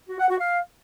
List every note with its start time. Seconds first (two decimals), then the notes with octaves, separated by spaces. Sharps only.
0.09 F#4
0.19 F#5
0.29 F#4
0.39 F5